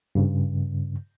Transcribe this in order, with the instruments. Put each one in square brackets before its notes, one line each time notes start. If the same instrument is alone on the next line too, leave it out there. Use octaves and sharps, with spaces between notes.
[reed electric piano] G2 C#3